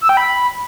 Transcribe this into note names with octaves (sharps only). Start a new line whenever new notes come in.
E6
G5
B5